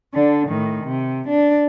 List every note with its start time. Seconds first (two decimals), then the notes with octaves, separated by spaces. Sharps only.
0.14 D3 D4
0.48 A2 D#3
0.84 C3
1.28 D4